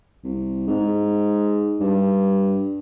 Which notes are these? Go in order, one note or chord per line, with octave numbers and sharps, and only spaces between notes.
C2
G#2
G2